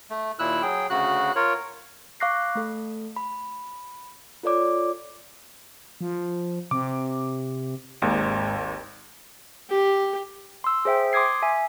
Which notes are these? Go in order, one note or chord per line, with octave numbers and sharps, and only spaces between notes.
A3
D#2 A#2 E4 E6 F#6
F#3 G#4 G5
D2 C#3 F#4 F#6
F4 A#4 C#5
F5 C#6 D6 F#6 A#6 C7
A3 A4
B5
F4 A4 C#5 D5 D6
F3
C3 D6
G#1 D#2 G#2
G4
C6 E6
G#4 C5 E5 G5
C6 D6 D#6 G#6 C7
E5 G#5